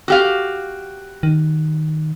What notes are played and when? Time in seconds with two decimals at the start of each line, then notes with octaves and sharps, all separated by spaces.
0.08 F#4 G4 F5
1.23 D#3